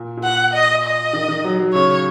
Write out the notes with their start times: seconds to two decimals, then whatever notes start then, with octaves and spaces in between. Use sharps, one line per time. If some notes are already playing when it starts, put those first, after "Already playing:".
Already playing: A#2
0.17 A#2
0.24 F#5
0.54 D#5
0.84 D#5
1.13 D#3
1.28 D#3
1.44 F#3
1.59 F#3
1.74 C#3 C#5